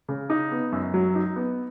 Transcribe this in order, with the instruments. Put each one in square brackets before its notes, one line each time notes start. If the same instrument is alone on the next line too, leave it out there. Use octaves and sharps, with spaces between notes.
[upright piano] C#3
D#4
B3
F#2
F#3
D#4
B3